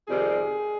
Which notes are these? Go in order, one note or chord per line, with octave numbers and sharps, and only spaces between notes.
F2 C3 D#3 G3 G#4